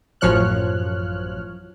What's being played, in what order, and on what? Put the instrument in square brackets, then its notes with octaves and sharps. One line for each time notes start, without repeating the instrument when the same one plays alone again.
[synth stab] A1 F#2 F3 C#5 F6 F#6